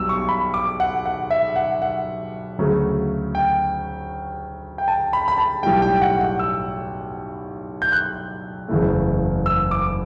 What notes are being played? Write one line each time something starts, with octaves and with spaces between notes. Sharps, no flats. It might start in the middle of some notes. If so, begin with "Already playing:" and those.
Already playing: B1 B2 G3 E6
C#6
B5
D6
F#5
F#5
E5
F#5
F#5
D2 C#3 F#3 A3
G5
G5
A5
B5
B5
A5
B1 A2 G3 G5
G5
F#5
F#5
E6
G6
F#6
F#1 E2 C#3 E3 A3
E6
D6